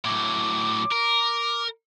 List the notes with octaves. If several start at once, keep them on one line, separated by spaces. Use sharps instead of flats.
A2 F#3 D6
A#4